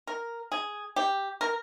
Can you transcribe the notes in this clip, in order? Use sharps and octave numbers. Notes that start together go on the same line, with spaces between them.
A#4
G#4
G4
A#4